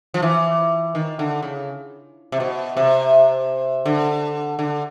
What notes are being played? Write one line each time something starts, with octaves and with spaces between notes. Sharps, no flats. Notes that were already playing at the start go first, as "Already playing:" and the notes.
F3
E3
D#3
D3
C#3
C3
B2
C3
D3
D3